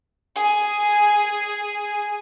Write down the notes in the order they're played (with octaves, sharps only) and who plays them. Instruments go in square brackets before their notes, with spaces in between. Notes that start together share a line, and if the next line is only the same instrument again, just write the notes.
[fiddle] G#4 G#5